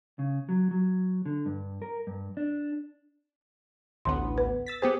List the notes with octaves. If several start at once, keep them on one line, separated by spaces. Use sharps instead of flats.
C#3
F#3
F#3
D3
G2
A#4
G2
D4
A1 D2 B3 C6
B4
E6 A6 B6
B3 G4 G#4 C5